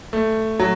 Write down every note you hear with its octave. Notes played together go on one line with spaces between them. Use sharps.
A3
F#3